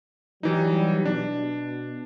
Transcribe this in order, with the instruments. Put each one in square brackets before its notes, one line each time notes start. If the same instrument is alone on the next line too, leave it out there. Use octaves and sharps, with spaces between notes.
[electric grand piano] E3 D#4 [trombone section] F#3 G3
[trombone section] B2 [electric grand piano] D4